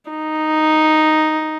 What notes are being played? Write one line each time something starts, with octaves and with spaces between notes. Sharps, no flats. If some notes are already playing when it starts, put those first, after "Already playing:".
D#4